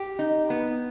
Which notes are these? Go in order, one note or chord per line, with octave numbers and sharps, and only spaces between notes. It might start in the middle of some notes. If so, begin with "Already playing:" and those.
Already playing: G4
D#4
B3